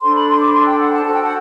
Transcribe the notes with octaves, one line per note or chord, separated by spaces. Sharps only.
D4 A4 C5 C6
B5
C6
D6
C6
G5
F#5
A5
F#4 A4 C5 A5
G5
F#5